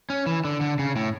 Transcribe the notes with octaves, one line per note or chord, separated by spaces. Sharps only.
C#4
E3
D3
D3
C#3
A2